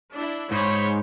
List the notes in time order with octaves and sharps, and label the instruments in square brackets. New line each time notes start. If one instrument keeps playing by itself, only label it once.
[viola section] D4 E4
[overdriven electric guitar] G#2 [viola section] C5 C#5 B5